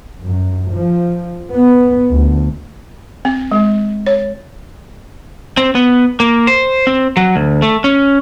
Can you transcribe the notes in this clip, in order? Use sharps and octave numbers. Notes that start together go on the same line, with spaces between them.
F#2
F3
B3
D2
C4
G#3
C#5
C4
B3
A#3
C5
C4
F#3
D2
A3
C#4